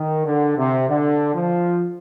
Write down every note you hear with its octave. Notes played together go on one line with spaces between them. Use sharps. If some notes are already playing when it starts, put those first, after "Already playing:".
Already playing: D#3
D3
C3
D3
F3